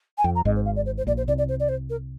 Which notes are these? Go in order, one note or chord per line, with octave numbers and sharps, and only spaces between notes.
G#5
F2 G5
A#5
G#1 G#2 D#5
C5
F5
D5
C5
C5
A#1 A#2 D5
C5
C2 C3 D5
D5
C5
D5
C5
A#4